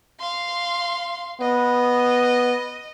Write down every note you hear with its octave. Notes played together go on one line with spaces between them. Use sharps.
F5 C6
B3 D#5